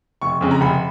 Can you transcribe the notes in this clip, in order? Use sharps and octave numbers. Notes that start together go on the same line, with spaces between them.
F1 C#6
F2 C#3 G#3
A#5
F1 B5